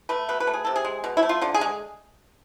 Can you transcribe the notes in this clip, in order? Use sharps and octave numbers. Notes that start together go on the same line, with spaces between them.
A3 B4
B2 B4
B4
A3
G#4
C3 A4
G#4
G#3
B2
E4
A3
F4
D3 F4
G#4
G#3